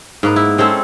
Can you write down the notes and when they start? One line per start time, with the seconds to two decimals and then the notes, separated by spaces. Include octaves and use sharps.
0.23 G#2 A#3 B3
0.36 E4
0.58 G#3 C4 C#4 A4